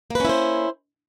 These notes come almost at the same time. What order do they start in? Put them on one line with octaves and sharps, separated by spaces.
A#3 B4 C#4 E4 C5